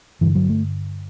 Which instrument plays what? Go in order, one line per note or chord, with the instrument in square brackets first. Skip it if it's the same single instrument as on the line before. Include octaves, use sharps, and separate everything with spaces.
[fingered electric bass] G2 D3 E3
F#3
A3